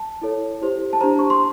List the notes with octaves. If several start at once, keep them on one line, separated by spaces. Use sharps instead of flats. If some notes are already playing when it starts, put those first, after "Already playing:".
Already playing: A5
E4 A4 C#5
E4 G4 C5
A5
D4 G4 C5 A#5
C#6
C6